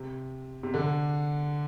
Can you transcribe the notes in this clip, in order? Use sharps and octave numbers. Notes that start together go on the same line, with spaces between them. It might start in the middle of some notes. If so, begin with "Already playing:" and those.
Already playing: C3
C3
D3